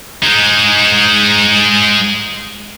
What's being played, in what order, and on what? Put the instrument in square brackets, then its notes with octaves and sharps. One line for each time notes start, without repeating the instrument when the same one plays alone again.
[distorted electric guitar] G#3 D#4